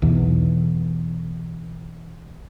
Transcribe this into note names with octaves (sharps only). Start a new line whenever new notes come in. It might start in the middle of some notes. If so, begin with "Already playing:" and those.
B1 E2